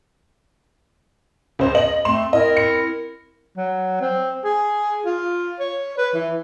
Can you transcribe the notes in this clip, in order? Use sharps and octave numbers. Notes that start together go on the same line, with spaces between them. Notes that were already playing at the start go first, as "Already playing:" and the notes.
C#2 C5
D#5 F#7
A3 C4 C6 E7
C4 E4 A#4 D#5
C#7
F#3
C4
G#4
F4
C#5
B4
E3